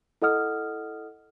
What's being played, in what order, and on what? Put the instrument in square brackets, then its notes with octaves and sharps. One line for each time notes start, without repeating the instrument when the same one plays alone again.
[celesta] E4 A4 D#5 F#5 D#6 F6